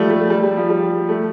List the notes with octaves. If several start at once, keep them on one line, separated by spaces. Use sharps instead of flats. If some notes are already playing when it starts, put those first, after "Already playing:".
Already playing: F3 G3 A3
A3
G3
G3
F3
G3
A3